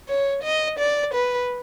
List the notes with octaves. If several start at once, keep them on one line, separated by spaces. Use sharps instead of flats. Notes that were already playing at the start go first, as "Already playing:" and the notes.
C#5
D#5
D5
B4